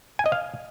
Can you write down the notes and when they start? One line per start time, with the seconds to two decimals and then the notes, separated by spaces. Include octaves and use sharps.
0.19 G#5
0.26 D#5
0.32 F5